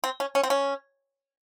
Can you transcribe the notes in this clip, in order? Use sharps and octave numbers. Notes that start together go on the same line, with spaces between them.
C4
C#4
C#4
C4
C#4